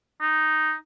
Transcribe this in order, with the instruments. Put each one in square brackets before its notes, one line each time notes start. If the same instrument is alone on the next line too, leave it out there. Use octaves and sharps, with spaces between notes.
[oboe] D#4